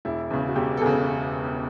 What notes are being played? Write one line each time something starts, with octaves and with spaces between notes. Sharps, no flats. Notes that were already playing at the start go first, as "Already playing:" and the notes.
E1 E4
E2 C#3
F#4
E1 G4
A4
E2 C#3 G#4